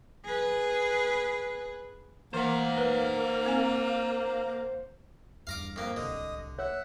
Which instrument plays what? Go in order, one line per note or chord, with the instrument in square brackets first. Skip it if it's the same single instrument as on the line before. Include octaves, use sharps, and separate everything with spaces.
[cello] G#4 B4
[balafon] E3 [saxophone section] A#3 [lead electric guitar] C5 F#5
[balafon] B4
C4 G#5
[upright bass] E2 G2 [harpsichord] F5 A#5 D6
[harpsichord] F2 A#3
[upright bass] D1 C2 [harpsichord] D3 [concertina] D#5 D#6
[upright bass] A#3 [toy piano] C#5 [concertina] E5 F#5